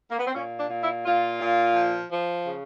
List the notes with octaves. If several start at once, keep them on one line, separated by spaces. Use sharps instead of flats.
A#3
B3
C4
A#2 C#4
D4
A#2
E4
A#2 F4
A#2
F3
F3
C#3